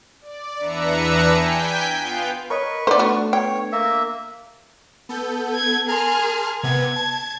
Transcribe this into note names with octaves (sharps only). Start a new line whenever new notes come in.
D5
E2 D4 B4 E5 A#5 C#7
G5 G#5 G6 B6
B3 F4 F5 G5
A#4 B4 C#5 D#5 C#6
A3 B3 D4 C5 D5
F#4
C#5 G5
A#3 E5
B3 A4 G6
G#6
G#4 A#4 A5 C6 F6
C3 B3 G#6
A5